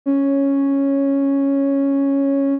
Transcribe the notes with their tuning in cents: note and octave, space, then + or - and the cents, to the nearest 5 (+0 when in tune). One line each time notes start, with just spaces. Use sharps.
C#4 -5